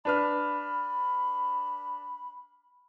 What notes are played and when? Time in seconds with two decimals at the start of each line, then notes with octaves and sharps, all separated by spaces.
0.05 D4 B4 B5 F6